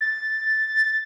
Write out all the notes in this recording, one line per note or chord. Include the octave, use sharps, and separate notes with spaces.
A6